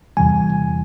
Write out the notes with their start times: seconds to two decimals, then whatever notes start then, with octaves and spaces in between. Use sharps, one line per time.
0.17 E2 C3 E3 G3 G#5